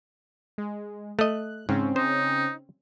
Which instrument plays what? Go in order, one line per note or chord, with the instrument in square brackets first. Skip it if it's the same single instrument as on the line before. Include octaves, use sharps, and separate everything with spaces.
[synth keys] G#3
[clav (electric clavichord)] A3 D#5 [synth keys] F#6
[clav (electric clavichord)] G#2 [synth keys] C#3 C4 C#4
[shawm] D#4 [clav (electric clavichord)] C5